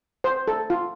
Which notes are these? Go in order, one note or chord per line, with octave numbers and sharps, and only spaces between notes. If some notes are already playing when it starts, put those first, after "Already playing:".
C5
A4
F4